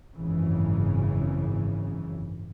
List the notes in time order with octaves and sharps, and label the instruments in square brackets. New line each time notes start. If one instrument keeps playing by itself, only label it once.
[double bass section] G#1 F#2 C#3 E3